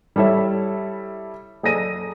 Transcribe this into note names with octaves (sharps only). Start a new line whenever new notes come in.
G3 E4 A4 C#5 E5
F#1 G#4 A4 D5 A#6 D#7